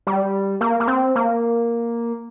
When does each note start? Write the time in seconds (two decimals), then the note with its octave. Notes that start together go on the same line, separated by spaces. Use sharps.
0.07 G3
0.61 A#3
0.80 A#3
0.88 C4
1.15 A#3